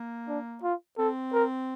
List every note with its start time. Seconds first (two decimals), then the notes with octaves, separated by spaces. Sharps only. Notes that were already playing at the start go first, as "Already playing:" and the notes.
Already playing: A#3
0.28 D4
0.63 F4
0.98 C4 A4
1.33 A#4